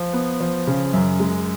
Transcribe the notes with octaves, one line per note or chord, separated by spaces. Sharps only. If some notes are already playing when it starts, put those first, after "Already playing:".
Already playing: F3
B3
F3
C#3
F#2
G#3